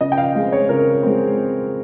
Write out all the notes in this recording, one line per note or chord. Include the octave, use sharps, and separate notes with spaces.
C#3 D#5
G5
F5
G#3 C4
C#5
C#3 A#4
G#3 C4